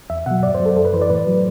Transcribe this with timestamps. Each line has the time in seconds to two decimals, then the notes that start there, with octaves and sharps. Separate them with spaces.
0.10 E2 E5
0.26 B2 F#3 F#5
0.43 G2 D5
0.54 C5
0.60 F#3
0.66 A4
0.76 F#2 A4
0.85 B4
0.93 E3 C5
1.01 D5
1.10 A2 B4
1.27 F#3